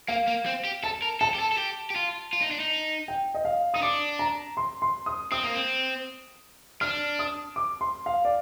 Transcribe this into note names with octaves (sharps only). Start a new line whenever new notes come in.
A#3 F5
A#3
C4
G4
A4 A5
A#4
A4 A5
G4
A4
A4
G4
G4
F4
F4
D#4
D4
D#4
G5
D#5
F5
D#4 D#6
D4 D6
A#5
C6
C6
D#6
C4 D#6
A#3
C4
D4 F6
D#6
D6
C6
F5
D5